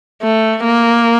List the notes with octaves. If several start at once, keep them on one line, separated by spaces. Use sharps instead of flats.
A3
A#3